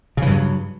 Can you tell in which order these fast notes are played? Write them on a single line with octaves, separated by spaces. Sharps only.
C#3 E3 G2 F#3